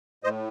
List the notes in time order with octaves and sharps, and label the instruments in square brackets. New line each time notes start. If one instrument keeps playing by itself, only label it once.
[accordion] A2 C5 D#5